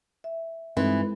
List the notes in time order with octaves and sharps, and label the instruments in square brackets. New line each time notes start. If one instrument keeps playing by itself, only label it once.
[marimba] E5
[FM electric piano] G2 C4 D#4 [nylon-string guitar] E3 [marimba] G#3 A4